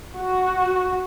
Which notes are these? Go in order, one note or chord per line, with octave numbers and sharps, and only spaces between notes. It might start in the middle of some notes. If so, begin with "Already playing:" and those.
F#4